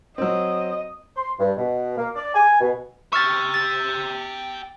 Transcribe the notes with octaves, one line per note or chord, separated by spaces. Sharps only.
F#3 C4 D#5
C6
G2
B2
A#3
D5
G#5
B2
G4 E5 C#6 F6 A6
A6